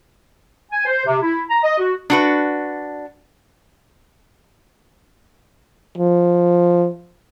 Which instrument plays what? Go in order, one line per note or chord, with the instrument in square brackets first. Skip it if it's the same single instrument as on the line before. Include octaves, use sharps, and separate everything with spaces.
[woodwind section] G#5
C5
C3
E4
A#5
D#5
F#4
[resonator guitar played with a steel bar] D4 F#4 B4
[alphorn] F3